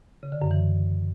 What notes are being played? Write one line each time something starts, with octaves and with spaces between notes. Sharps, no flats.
C#3
D3
F#2
E3